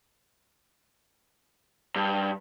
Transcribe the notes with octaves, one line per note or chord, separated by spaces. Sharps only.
G2